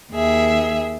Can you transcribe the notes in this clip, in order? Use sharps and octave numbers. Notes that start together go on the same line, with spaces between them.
D#2 G#4 E5